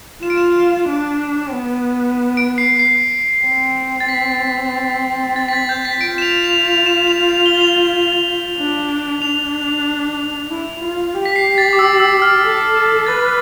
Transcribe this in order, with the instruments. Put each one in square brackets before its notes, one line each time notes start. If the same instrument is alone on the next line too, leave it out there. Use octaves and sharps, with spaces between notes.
[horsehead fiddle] F4 [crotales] E7
[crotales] D7
E7
[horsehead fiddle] D4
B3
[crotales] D7
C7
C7
[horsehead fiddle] C4
[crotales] A6
B6
A6
B6
A6
G6
B6
[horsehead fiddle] F4 [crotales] D7
[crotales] E7
F7
F7
F7
E7
F7
F7
G7
G7
F7
[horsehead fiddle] D4
[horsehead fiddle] D4 [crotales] F7
[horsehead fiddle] E4
F4
G4
[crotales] B6
C7
A6
D6
E6
E6
F6
[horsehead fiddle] A4
[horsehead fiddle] B4 [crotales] A6